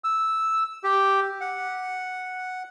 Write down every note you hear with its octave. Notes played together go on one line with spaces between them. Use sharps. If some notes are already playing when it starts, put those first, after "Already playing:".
E6
G4
F#5